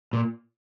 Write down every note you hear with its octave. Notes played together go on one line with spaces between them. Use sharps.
A#2